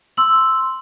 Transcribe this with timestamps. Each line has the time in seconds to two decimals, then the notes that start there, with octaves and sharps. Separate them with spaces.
0.17 C6 E6 F#7